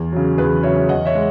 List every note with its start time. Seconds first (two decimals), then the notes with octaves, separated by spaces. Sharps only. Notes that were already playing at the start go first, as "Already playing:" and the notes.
Already playing: E2
0.12 C#3 F#3
0.38 E2 G#4 B4
0.63 C#3 F#3 C#5 E5
0.89 E2 D#5 F#5
1.05 C#5 E5
1.15 G#3